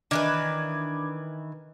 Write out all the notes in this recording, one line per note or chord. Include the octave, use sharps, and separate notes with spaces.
D#3 E3 D4 B4 D6 G#6